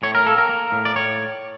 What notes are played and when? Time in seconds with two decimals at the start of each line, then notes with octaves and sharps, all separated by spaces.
0.03 A2 C#5
0.15 A#4
0.26 A#3 A4
0.38 A#4
0.49 A#3
0.72 A2
0.85 D5
0.96 A2 C#5